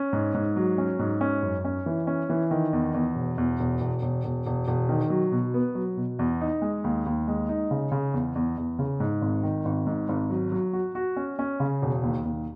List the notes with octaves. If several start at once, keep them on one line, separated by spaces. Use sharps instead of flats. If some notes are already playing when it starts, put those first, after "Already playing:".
Already playing: C#4
G#2
G#2
F#3
C#4
G#2
C#4
F#2
C#4
E3
C#4
E3
D#3
E2
E2
E1
E2
E1
E1
E1
E1
E1
E1
D#3
F#3
B2
B3
F#3
B2
E2
D#4
G#3
D#2
D#2
G#3
D#4
C#3
C#3
E2
E2
E2
C#3
G#2
G#1
D#3
G#1
G#2
G#1
F#3
F#3
F#4
F#4
C#4
C#4
C#3
E1
D#2
D#2